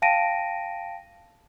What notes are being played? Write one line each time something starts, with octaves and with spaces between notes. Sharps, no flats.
F5 G5 A5 A#6 D7 D#7